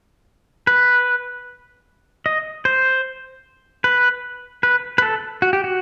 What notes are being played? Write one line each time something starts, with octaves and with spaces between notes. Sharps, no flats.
B4
D#5
C5
B4
B4
B4
A4
F#4
G4
F#4